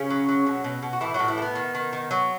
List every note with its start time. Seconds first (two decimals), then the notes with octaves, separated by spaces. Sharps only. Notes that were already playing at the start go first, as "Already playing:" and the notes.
Already playing: C#3 C#4
0.10 F#3
0.29 F#3
0.47 B2
0.64 B2
0.83 B2
0.93 F#4
1.01 A2 E3 E4
1.14 A2 F#3 F#4
1.28 E3 E4
1.38 A3
1.42 B3
1.55 D#3
1.75 D#3
1.93 D#3
2.11 F#3